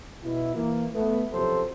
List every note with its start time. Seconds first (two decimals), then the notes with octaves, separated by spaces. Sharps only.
0.24 B2 E4
0.55 E3 A#3
0.94 A3 B3
1.33 F#2 C3 F3 F#3 A4 C5